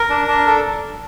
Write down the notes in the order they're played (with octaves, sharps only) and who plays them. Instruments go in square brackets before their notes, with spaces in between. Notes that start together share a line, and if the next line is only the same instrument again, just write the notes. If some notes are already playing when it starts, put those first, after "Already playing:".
Already playing: [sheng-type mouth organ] A#4
D4
D4
A4